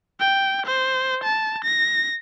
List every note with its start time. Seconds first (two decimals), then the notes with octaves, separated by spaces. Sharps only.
0.20 G5
0.66 C5
1.24 A5
1.64 A#6